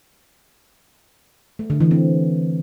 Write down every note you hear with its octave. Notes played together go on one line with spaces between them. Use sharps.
A3
D3
E3
C4